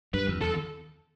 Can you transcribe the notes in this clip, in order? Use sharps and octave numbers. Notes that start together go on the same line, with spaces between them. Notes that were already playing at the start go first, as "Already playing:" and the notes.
G2 B4
F2
E2 A4